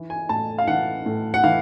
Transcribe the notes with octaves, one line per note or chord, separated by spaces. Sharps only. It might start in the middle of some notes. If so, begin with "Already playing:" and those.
Already playing: E3
G#5
A2 A5
F5
E3 F#5
A2
F#5
E3 F5